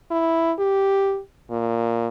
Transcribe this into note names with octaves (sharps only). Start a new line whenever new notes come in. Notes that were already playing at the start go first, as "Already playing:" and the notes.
E4
G4
A#2